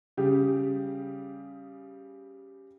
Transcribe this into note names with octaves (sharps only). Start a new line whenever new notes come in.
C#3 G3 G4 G#4